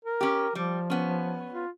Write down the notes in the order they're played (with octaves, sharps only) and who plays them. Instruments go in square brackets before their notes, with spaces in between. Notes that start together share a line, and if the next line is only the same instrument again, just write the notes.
[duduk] A#4
[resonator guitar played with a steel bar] C#4 G4
[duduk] F3 [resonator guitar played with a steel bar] G3
[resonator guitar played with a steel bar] B3 C#4
[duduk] F4